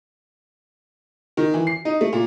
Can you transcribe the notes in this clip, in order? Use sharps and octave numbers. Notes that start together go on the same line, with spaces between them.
D#3
E3
C7
D#4
A3
A#2